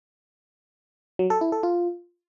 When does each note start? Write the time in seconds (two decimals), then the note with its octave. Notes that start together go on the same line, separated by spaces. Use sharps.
1.19 F#3
1.30 A4
1.41 E4
1.52 A4
1.63 F4